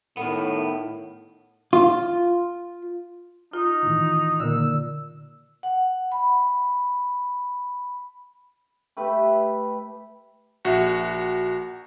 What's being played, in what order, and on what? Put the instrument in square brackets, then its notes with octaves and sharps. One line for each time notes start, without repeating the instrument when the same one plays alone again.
[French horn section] A2 [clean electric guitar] D#3 B3
[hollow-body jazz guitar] F4
[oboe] D#4 [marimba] F4
[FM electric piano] A2 D#3 E3
[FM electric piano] A#2 D#3 A#3 [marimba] D3 [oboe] E6
[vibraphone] F#5
B5
[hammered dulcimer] A3 G4 B4 E5
[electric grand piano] A#1 F#4 [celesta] E5 F#5